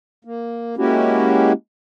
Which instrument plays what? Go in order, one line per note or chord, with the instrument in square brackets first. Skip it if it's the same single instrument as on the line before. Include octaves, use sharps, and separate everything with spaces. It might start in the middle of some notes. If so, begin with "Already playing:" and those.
[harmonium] A#3
G#3 A#3 C#4 E4 F#4 G4